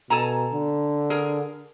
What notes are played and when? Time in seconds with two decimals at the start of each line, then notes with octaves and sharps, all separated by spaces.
0.10 B2 A4 G#5 A#5
0.53 D3
1.10 G#4 A#4